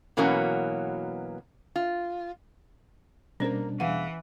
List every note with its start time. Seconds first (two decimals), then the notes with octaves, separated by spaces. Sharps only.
0.17 B2 E3 F#3 A#3 B3 C#4
1.76 F4
3.40 B2 G3 A#3 C#4 D4 A#4 C5
3.80 E2 E3 F5 F#5